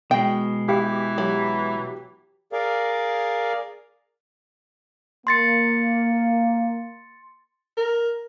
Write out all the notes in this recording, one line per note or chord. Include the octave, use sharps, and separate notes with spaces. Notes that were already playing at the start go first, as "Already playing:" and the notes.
B2 G#3 G5
E3 G4
F#3
G#4 A#4 D5 F5
A#3 C6 A6 C#7
A#4